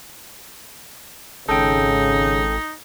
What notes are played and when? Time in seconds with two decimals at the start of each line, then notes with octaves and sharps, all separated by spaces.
1.49 G#1 C#3 D#4 A4 G5